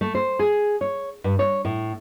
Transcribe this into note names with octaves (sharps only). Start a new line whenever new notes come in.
A3
C5
G#4
C#5
G2
C#5
A2